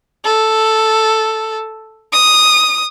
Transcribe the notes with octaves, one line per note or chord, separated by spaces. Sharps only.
A4
D#6